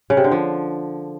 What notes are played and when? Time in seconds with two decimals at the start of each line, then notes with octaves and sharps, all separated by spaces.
0.10 C#3
0.17 C3
0.24 D3
0.32 F3